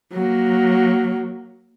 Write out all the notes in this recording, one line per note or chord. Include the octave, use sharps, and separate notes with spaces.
F#3 A#3